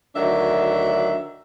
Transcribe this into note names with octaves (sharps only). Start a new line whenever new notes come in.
D2 D#3 F#3 D4 E5